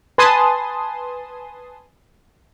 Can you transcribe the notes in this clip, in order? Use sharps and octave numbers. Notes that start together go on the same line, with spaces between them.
B4 G#5 A5 C6 D#6